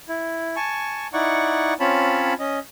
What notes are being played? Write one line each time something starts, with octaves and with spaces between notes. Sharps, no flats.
E4
G#5 A5 C#6
D#4 E4 D5 F#5 C#6
C4 C#4 F4 C#5 A5 B5
C#4 D#5